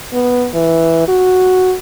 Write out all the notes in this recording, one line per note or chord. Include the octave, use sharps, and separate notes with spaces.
B3
E3
F#4